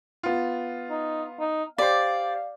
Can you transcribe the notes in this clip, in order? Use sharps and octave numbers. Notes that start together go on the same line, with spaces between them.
B3 F4
D#4
D#4
G4 C5 D5 F5